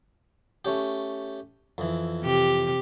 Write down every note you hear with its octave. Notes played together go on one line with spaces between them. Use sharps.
A3 C#4 G4
F2 E3
C3 G4